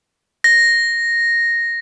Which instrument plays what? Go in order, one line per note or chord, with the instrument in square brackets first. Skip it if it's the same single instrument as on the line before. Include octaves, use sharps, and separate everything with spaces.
[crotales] A#6